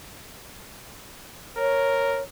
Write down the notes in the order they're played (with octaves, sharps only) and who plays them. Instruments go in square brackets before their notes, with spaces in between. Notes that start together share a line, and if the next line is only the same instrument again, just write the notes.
[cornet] A#4 [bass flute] C#5